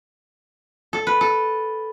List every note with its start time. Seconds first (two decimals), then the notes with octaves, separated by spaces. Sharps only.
0.93 A4
1.07 B4
1.21 A4